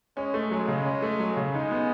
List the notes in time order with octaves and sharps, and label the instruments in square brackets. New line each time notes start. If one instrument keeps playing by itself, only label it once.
[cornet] G#3 [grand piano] C#4
[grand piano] A3
[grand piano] F#3 [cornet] G#3
[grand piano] C#3
C#4
A3
F#3
C#3
[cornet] G#3 [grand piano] D#4
[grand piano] B3